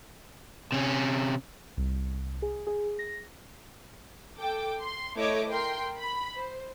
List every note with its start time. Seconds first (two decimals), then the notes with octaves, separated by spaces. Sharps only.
0.72 C3 C#4
1.77 C2
2.42 G#4
2.67 G#4
2.99 A#6
4.39 A4 G5 D6
4.82 C6
5.16 A3 E4 C#5 D#5 D6
5.50 A#4 G5 C6
6.00 B5
6.35 C5